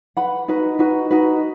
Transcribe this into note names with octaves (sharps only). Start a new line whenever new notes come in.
B4 F#5 B5
D#4 F#4 B4
D#4 F#4 B4
D#4 F#4 B4